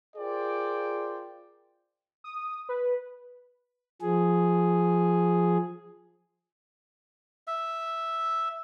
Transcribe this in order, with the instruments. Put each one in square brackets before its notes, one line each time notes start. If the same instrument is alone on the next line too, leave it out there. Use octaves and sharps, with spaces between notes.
[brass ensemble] F4 G#4 A#4 C5 D5 G5
[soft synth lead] D#6
B4
[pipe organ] F3 G#4
[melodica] E5